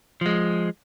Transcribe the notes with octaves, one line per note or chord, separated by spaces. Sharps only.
F3 G#3